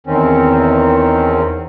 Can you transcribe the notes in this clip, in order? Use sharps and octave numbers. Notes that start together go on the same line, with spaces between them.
E2 D#3 C4 C#4